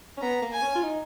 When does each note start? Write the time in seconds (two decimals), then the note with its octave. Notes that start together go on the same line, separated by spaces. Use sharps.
0.17 C#4
0.22 B3 A#5
0.42 A#3
0.52 G#5
0.62 C#4
0.75 F4
0.83 D#4